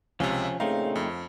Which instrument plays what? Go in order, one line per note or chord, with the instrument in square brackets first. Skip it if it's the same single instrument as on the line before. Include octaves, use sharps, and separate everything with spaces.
[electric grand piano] C#2 C3 [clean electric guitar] F3 C#4
[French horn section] G2 A#2 C#3 [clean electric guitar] A3 C4 D#4 [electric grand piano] F5
[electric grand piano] F2